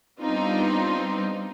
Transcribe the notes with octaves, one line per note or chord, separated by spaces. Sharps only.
G3 B3 C4 D4 D#4 F4